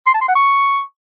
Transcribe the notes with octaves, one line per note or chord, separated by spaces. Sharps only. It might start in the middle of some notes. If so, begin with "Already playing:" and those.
C6
A5
C6
F#5
C#6